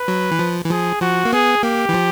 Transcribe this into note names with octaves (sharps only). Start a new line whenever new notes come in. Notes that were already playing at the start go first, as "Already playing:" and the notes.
Already playing: B4
F#3
E3
F3
E3
F3 G#4
F3 F#4
A#3
B3 G#4
A#3 G4
E3
F3